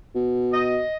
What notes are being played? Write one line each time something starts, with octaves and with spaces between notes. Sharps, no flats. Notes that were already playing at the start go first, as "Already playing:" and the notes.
B2
D#5